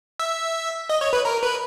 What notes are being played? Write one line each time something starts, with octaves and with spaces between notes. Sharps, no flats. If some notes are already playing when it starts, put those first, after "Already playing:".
E5
D#5
C#5
B4
A#4
B4